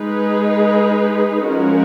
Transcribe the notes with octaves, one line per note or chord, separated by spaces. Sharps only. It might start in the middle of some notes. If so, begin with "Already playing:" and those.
Already playing: G#3 D#4 G#4 B4
F3 G#3 C#4 F#4 A#4